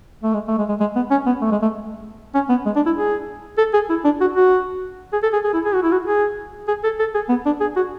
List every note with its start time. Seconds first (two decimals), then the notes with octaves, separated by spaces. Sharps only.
0.24 A3
0.34 G#3
0.48 A3
0.58 G#3
0.69 G#3
0.80 G#3
0.96 B3
1.11 C#4
1.26 B3
1.42 A3
1.51 G#3
1.62 A3
2.35 C#4
2.49 B3
2.66 G#3
2.76 D4
2.86 E4
2.96 G#4
3.58 A4
3.74 G#4
3.89 E4
4.05 D4
4.21 F#4
4.36 F#4
5.13 G#4
5.23 A4
5.33 G#4
5.44 G#4
5.54 E4
5.65 G#4
5.74 F#4
5.83 E4
5.92 F#4
6.06 G#4
6.68 G#4
6.84 A4
6.99 A4
7.14 G#4
7.29 B3
7.46 D4
7.61 G#4
7.76 F#4